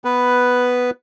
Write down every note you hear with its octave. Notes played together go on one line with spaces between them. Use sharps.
B3 B4